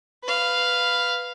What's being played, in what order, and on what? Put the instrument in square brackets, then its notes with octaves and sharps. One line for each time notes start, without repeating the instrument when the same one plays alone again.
[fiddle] B4 F5